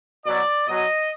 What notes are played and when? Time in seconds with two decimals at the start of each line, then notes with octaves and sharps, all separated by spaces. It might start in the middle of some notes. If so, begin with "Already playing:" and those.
0.25 B2 F#3 D5
0.67 B2 F#3 D#5